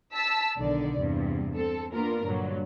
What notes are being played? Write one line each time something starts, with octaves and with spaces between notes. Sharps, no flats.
A5 E6 B6
B1 D3 D#3 D5
E2 G2 C3
C4 A4
A#3 B3 D4 F4 A#4
G2 A#2 D3 F#3